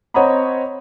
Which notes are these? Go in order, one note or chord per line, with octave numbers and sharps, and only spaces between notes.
C4 C#5 D#5 F#5 A#5 B5